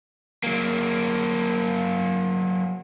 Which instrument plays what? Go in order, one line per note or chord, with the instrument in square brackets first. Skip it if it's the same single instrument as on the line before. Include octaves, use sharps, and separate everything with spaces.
[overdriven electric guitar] F#3 A#3